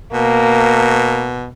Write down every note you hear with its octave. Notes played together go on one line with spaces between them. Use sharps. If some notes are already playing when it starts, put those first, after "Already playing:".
B2 A#3